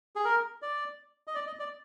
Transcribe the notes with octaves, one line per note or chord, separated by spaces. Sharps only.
G#4
A#4
D5
D#5
D5
D#5
D5